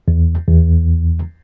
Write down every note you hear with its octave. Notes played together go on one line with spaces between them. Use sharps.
E2
E2